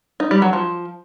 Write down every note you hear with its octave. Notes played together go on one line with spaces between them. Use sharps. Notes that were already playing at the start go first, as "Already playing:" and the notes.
D#4
G3
F#3
F3